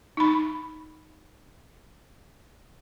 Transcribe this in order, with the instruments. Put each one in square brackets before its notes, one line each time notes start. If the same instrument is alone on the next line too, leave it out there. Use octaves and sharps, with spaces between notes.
[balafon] D#4 B5